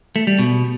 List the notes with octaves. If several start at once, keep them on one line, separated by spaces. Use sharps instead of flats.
A3
G3
B2